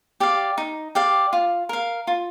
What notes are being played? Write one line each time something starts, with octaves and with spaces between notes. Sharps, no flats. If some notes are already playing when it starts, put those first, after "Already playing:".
G4 D5 F5
D#4
G4 D5 F5
F4
A#4 F5
F4